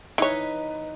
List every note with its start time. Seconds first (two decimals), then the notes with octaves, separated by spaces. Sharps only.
0.18 E3 D#4 B4 C#5